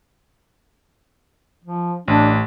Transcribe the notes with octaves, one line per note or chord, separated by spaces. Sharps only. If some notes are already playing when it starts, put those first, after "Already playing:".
F3
A1 D4